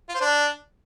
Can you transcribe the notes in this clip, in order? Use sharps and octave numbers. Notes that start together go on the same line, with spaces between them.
F4
C5
D4